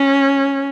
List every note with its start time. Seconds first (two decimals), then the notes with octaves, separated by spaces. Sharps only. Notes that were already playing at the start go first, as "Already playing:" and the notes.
Already playing: C#4